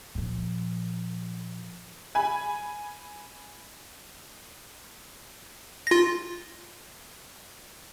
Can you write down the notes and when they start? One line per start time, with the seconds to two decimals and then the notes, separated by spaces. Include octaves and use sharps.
0.15 A#2 F3
2.15 G#5 B5
5.87 F4 A#6